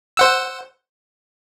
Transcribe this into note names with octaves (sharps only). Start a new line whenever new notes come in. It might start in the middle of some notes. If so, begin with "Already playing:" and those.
C5 F#5 E6